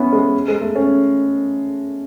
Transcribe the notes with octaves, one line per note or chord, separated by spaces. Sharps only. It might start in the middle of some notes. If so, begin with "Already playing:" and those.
Already playing: B3 C#4 E4
G#3
G#3
A3
C#4